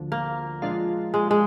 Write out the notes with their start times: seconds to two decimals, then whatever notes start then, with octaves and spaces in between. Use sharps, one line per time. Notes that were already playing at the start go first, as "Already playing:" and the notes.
Already playing: D2 D3 F3
0.12 A#3
0.62 A#2 F3 G#3 D4 F4
1.14 G#3
1.31 G#3